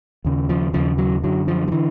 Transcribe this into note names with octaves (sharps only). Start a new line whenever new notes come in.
D#2 C#3
F3
D#2 C#3 F3
F#3
F#2 D3 F#3
F3
F3
D3 E3